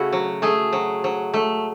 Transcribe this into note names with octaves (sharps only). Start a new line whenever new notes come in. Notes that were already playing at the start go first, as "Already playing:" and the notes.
Already playing: C#3 A3 E4 F#4
F#3
A3 G#4
F#3
F#3
A3